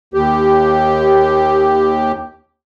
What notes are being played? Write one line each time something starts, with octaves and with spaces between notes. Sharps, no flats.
D#2 G4